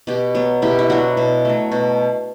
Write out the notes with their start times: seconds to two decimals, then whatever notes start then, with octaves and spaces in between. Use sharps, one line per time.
0.07 B2 G4 B4
0.35 F#3 B3
0.62 B2 E4 G4
0.79 E4
0.90 F#3 B3 D4 F#4
1.17 B2
1.45 F#3 A3
1.72 B2